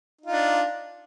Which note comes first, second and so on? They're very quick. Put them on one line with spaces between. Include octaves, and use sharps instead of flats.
D#4 F4 D4